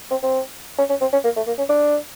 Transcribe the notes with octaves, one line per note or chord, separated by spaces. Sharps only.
C4
C4
C#4
C#4
C4
C#4
A#3
A3
A#3
C#4
D4